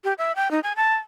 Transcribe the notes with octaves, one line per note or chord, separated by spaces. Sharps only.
G4
E5
G5
D#4
G#5
A5